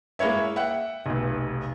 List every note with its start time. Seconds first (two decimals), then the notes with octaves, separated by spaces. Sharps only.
0.19 G#3 A#3 E4 C#5 E5
0.56 E5 F#5 G5
1.06 F1 B1